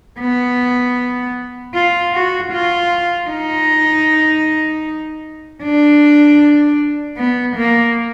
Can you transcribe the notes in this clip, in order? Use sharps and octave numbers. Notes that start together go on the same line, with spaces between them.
B3
F4
F#4
F4
D#4
D4
B3
A#3